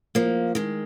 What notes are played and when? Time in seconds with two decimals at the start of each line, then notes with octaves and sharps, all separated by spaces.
0.15 F3 A#3
0.55 D#3 G#3